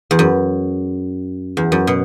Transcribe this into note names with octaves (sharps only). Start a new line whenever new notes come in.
E2
F#2
E2
F#2
B2